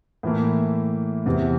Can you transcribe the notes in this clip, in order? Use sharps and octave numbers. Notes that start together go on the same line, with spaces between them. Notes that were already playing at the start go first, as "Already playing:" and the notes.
A2 E3 A#3
E2 C3 E3